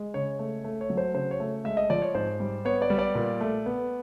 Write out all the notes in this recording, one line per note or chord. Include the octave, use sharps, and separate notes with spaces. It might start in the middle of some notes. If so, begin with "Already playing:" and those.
Already playing: G#3
C#3 C#5
A3
A3
C#5
F#3
C5
C#3 C5
C#5
A3
G#3 E5
D#5
F3 D5
C#5
G#2 C5
G3
B3 C#5
D5
G3
D5
A#2
A3
B3